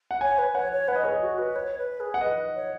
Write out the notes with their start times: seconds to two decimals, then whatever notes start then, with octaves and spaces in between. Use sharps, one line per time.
0.11 F#5
0.21 C#5 G#5
0.38 B4
0.55 C#5 F#5
0.72 C#5
0.88 B4 F#5
0.96 D#5
1.03 G#4 C#5
1.11 D#5
1.21 F#4
1.38 B4
1.55 C#5
1.78 B4
2.00 G#4
2.14 F#5
2.21 B4 D#5
2.55 C#5